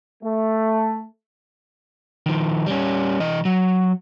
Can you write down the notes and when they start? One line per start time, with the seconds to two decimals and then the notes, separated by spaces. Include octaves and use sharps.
0.23 A3
2.26 D#3 F3
2.66 G3 C#4
3.20 E3 D#5
3.45 F#3